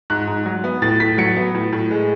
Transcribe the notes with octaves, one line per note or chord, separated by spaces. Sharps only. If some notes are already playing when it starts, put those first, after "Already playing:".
G#2 F#6
G#2
F#3
B3
A2 A6
A2 B6
F#3 C#7
B3
A2
A2
G#3